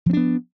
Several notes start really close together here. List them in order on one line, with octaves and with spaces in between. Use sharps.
F3 C4 D4 B3